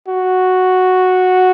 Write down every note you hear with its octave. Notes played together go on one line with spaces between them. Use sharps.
F#4